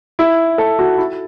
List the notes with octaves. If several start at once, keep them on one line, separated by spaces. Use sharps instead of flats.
E4
A4
F#4
E4